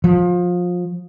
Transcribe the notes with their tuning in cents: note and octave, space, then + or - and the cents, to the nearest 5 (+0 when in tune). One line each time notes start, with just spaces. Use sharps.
F3 +25